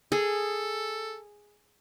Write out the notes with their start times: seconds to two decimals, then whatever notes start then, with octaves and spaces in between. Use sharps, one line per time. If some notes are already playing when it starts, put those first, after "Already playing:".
0.12 G#4 A4